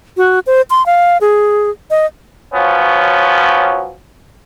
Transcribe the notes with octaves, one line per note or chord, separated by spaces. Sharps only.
F#4
C5
C6
F5
G#4
D#5
F3 F#3 B3 C#4